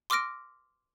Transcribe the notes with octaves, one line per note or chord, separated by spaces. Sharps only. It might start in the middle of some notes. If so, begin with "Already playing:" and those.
C6 D6 E6 F6 A#6 D7